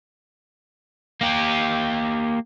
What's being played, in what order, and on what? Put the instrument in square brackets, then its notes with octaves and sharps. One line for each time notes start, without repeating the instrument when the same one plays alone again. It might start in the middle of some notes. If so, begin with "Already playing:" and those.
[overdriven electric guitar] A#3 G4